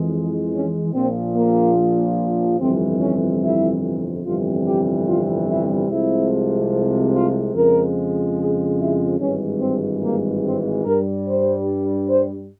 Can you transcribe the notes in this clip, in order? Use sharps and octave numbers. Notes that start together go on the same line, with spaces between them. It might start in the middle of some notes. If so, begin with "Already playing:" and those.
Already playing: F2 E3 G#3
C#4
A#1 A#2 F3 C4
A#3
G1 F2 C3 E3 G3 C4
C#4
E4
G1 F2 C3 E3 G3 F4
G4
F4
E4
C2 C3 F3 G#3 E4
F4
F2 C#3 F3 G#3 A#4
G#4
E4
G#1 G2 E3 G#3 C#4
C4
A#3
C4
G2 G3 A#4
C5
C5